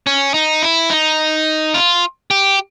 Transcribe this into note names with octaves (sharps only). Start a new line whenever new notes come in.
C#4
D#4
E4
D#4
F4
G4